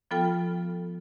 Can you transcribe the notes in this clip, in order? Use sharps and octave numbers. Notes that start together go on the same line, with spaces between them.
F3 B3 F4 A4 G5 F6